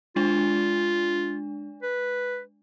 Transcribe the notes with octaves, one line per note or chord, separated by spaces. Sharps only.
G#3 D4 F4
B4